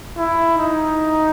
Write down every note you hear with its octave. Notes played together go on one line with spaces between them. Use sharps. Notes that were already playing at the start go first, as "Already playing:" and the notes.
E4
D#4